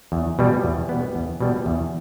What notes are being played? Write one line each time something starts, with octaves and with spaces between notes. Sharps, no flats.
E2
B2 G3 B3
E2
B2 G3 B3
E2
B2 G3 B3
E2